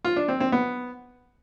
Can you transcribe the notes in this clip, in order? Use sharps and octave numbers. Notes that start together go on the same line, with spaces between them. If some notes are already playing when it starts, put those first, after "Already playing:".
F4
D4
C4
C4
B3